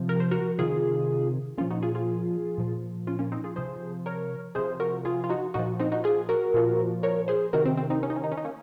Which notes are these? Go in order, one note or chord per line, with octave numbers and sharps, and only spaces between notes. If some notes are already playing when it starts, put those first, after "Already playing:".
Already playing: C3 F3
A#4
C5
F#4 A#4
C3 D#3 F4 G#4
A#2 F3 C#4 F4
D#4 F#4
F4 G#4
F4 G#4
A#2 F3
C#4 F4
A#3 C#4
C4 D#4
F4 G#4
C3 F3 G#4 C5
A#4 C#5
C3 F3 G#4 C5
F#4 A#4
F4 G#4
F4
D#4 F#4
A#2 F3 D#4 F#4
C4 D#4
D#4 F#4
F4 G#4
F#4 A#4
A#2 F3
A#4 C#5
G#4 C5
C3 D#3 F#4 A#4
C4
C4
C4 D#4
C#4
D#4
C#4
D#4
C#4
D#4
A#3 C#4